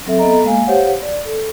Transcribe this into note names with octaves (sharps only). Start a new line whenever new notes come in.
F#3 C4 A4 E5
B3 A4 D#5 A#5
G#3 A#3 F5 G#5
G4 C5 C#5 F5 F#5
D5
A4